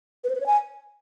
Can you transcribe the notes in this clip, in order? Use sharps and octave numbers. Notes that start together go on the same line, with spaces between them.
B4
C5
B4
C#5
G#5